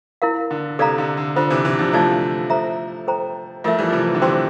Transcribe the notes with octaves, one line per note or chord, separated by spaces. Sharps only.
E4 A#4 F5
D3
C3 A4 D5 F5 A#5
D3
D3
D3 F4 A4 C5
C3 E3
C3 E3
D3 F3
F3 A3 E4 A4 D5 F5 A5
A4 C5 E5 A#5
A4 C5 G5 A#5
F3 A3 F4 A#4 E5
E3 G3
F3
C3 E3
E3
D3
C3 E3 G4 C5 G5 C6